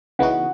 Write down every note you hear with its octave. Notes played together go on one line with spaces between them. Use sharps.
C#3 E3 B3 D#4 F#4 F#5